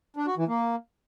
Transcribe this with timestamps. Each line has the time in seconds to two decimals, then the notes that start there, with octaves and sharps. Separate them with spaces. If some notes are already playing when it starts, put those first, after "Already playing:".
0.16 D4
0.27 F#4
0.37 E3
0.48 A#3